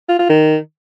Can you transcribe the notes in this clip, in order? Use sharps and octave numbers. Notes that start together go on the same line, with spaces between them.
F4
F4
D#3